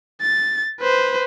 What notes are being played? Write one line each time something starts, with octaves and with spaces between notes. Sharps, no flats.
A6
B4 C5